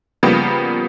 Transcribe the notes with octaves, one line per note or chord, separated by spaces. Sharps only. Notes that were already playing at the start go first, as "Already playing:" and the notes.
C#3 F3 G3 A#3 B3